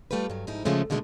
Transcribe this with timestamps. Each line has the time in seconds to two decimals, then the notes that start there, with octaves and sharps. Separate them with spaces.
0.11 G3 A3 F4 G4 B4
0.30 G2 F#3
0.47 G#2 F3 D#4 E4
0.65 C#3 F3 G#3 A3 C#4
0.90 B2 D3 D#3 G#3 A3